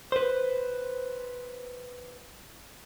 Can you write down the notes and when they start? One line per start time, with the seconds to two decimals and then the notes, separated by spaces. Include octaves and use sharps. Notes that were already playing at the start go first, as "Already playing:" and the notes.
0.12 B4 C5